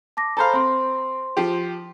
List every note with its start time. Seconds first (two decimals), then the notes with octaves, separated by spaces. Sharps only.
0.17 A5 D6 A#6
0.37 A4 C5 F5 A#5 B5
0.53 C4 C5 C6
1.37 F3 G4